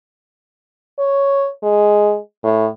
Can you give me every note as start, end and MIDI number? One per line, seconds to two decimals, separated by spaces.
0.99 1.48 73
1.63 2.18 56
2.44 2.67 45